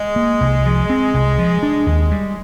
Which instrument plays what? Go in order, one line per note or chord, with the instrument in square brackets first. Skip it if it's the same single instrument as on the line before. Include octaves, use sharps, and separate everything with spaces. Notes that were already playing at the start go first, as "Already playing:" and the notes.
Already playing: [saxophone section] G#3
[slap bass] A#3
C2
F3
C4
C2
F3
D4
D#2
G3